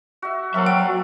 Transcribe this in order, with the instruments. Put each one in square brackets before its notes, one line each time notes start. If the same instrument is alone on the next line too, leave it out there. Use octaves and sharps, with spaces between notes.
[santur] F#4 E5
[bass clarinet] F#3 [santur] A#3 C4 A4 [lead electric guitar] E5 F#5
[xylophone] G5
[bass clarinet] F#4